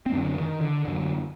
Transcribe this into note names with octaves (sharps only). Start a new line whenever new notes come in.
C4
F#2 D3 D4
D#3
D3
F#2 D3